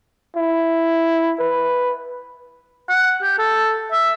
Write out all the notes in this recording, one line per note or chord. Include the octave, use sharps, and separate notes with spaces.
E4
B4
F#5
G4
A4
E5